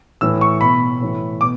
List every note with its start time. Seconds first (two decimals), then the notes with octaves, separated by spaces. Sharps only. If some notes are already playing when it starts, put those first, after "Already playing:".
0.21 A2 E3 E6
0.41 C#6
0.61 B2 B5
1.01 A2 E3
1.41 B2 D6